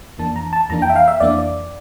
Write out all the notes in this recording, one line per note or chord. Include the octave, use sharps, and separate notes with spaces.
F2 E3 A#3 D4 A5
A#5
A5
F2 E3 A#3 D4 A#5
G5
E5
F5
E5
F2 E3 A#3 D4 D5
D5